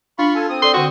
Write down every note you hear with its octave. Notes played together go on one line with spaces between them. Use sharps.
D4 F4 B5 C#6
A4 G#5
C4 D#6
A4 D5 C6
D3 F#4 C6 C#6